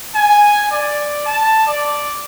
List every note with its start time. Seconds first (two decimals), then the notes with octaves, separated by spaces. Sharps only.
0.14 G#5
0.70 D5
1.26 A5
1.66 D5